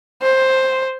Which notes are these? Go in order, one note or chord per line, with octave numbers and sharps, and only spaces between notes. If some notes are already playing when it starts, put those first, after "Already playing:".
C5